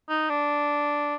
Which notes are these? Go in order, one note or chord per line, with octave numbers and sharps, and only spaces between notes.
D#4
D4